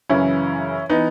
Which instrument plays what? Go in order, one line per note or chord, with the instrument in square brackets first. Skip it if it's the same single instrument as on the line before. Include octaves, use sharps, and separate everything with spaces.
[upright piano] F#2 C#3 E3 C#4 E4
E3 B3 D#4